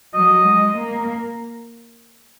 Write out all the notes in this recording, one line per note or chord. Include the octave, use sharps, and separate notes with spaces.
F#3 D#5
G#3
A#3